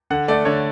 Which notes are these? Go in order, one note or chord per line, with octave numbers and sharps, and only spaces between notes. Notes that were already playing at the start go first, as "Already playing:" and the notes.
D3 F#5
A3 D5
D3 C#5